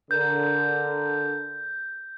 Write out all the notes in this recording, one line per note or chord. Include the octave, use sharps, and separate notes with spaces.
D3 A#4 G6